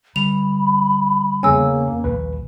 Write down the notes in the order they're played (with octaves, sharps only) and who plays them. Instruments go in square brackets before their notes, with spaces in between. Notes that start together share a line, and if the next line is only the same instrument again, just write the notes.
[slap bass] D3 G3 [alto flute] B5 [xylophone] F7
[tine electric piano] E2 C#3 C#4 [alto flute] A#3 [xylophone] G#5 E6
[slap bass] A#1 D#2 [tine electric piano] B4